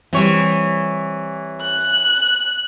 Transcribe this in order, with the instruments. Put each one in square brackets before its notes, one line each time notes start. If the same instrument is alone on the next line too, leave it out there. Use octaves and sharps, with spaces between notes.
[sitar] E3 C#5 [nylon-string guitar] G3 C4
[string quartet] F#6